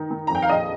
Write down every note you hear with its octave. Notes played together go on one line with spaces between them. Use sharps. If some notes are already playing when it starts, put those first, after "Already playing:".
Already playing: D#3 D#4
D#3
A#5
F2 G5
F5
A#1 D#5